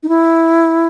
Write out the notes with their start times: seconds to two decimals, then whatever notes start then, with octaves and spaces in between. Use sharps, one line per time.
0.03 D#4
0.09 E4